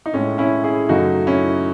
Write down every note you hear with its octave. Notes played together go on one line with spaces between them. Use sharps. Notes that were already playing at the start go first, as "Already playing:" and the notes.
D#4
A2 G#3 C#4
C#4 E4
E4 G#4
F#2 C#3 F#3 A3 D#4 F#4
C#4 E4